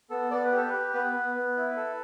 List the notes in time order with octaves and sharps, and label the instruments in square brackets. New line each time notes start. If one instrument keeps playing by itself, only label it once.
[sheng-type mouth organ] B3 A4
B3 D5
B4
G4 A4
G4 B4
B3 B4
B3
B3
E4
A4